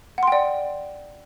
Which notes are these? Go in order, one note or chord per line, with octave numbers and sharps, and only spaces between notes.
D5 F#5 G5 C6